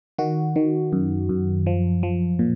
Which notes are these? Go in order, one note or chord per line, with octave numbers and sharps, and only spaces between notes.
D#3 F#4
D#3
F#2
F#2
F3
F3
A#2